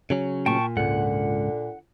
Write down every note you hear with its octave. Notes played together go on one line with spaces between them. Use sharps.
C#3 F#3 C#4
A#2 G5 A5 C#6
C#2 G#2 D3 F#5